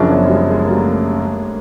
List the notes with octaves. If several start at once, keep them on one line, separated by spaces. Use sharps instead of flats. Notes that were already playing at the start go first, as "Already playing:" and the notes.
Already playing: F#2 C#3 F3 C4 D4
B3 C#4
G#3
G3
G#3
A#3
G3 A3